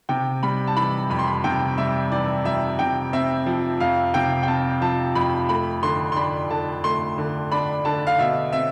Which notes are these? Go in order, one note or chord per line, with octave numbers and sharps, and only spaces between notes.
C3 G5
G3 B5
A5
E3 B5
F2 B5
C6
B5
C3 G5
G3 E5
E3 D5
F2 E5
C3 G5
C4 E5
F3
F2 F5
C3 G5
G5
C4 A5
F3 A5
F2 B5
A3 B5
D3 C6
C6
D4 B5
D3 A5
A3 C6
D3
D4 B5
D3 A5
F5
B2 E5
C4 E5